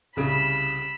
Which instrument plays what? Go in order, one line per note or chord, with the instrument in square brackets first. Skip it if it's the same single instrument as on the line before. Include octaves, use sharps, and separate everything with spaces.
[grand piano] C2 C#3 [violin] B5 E6